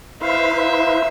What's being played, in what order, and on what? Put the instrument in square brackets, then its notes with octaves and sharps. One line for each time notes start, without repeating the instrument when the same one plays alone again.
[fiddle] D#4 E5 [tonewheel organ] E4 B4 C5 [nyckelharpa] F5